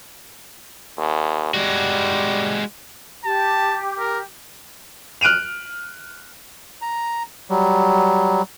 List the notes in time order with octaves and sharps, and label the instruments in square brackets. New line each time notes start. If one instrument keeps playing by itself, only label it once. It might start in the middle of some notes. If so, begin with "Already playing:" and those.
[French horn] D#2
[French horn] G3 [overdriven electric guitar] G#3 F#4
[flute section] G4 [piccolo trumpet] A5
[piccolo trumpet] A#4
[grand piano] F6 F#6 D7 D#7 F7
[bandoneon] A#5
F#3 G3